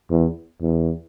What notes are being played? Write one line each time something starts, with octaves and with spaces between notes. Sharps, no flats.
E2
E2